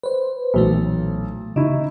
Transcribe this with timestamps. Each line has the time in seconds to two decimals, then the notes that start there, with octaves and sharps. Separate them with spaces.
0.03 B4 C5
0.54 B1 A#2 E3 A3
1.56 C#3 D#4 E4